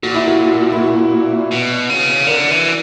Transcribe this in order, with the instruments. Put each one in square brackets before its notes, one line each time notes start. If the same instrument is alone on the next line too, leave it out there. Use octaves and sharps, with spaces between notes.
[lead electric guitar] A#2 [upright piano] F#4
[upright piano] E4
F#4
E4
F#4
[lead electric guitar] B2
C#3
[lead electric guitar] D3 [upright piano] A#4
[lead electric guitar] E3